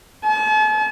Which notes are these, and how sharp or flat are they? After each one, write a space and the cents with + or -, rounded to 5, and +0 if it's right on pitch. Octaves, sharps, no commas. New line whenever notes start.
A5 -45